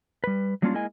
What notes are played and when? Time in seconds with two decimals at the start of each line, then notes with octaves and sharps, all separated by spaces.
0.24 G3 B4
0.62 F#3 G3 A#3 C#4 D4 F4
0.74 G#3 A#3 E4 D#5 G#5